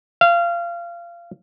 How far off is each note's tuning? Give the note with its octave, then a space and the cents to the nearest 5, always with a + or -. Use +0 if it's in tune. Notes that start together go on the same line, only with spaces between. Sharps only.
F5 -25